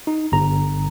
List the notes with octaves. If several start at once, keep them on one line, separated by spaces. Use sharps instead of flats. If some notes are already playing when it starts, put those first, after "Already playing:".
D#4
G1 A#5